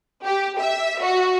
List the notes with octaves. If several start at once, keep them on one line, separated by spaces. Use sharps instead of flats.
G4
E5
F#4